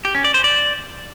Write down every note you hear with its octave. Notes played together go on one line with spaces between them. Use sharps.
G4
C#4
D5
C5
D5